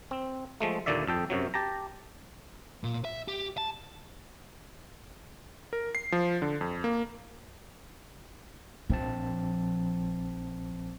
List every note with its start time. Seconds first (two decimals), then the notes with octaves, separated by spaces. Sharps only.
0.11 C4
0.61 F3 G#3 A3
0.86 D#2 A#2 D3 D5 E5
1.07 F2 A4 G5
1.30 F#2 C3 F#3
1.54 G4 A5 A#5
2.84 A#2
3.05 E5
3.28 G4
3.58 A5
5.73 A#4
5.95 C7
6.12 F3
6.42 D3
6.61 F2
6.84 A#3
8.90 A#1 F3 C4 A5